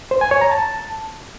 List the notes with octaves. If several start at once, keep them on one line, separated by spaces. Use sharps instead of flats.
C5
G#5
C#5
A#5
A5